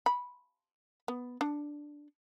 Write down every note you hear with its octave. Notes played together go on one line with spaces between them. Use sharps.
B5
B3
D4